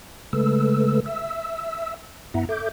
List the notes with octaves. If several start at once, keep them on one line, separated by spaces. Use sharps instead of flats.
C#3 G#3 A3 A4 B4 E6
E5 E6
G2 B3 E4 E5 F#5 A#5
A4 E5 D6 G6